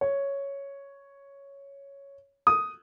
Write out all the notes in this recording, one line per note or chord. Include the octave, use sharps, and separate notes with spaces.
C#5
D#6